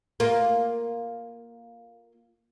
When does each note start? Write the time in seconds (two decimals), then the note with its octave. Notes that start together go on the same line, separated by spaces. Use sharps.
0.20 A#3 F4